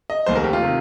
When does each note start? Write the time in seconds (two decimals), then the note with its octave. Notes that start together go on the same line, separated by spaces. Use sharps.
0.10 D#5
0.26 F1 D#2 D#3 C5
0.35 A#4
0.44 G4
0.53 F4
0.63 C3 D#3